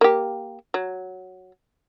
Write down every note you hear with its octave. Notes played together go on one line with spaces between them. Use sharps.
A#3 G4
F#3